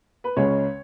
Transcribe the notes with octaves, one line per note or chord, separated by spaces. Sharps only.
B4
C#2 C#3 G#3 C#4 C#5